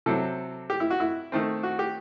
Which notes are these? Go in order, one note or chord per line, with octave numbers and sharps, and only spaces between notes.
C3 F#3 C4 A4
G4
E4
F#4
E4
D#3 A3 C4
F#4
G4